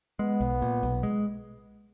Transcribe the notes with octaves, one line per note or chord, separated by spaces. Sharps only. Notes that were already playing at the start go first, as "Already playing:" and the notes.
G#3 B3
B1
A#2
B1
G#3